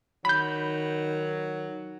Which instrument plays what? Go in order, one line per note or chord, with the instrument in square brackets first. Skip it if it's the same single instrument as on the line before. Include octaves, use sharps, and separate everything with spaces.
[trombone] D#3 [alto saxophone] F#3 [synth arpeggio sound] B5 G6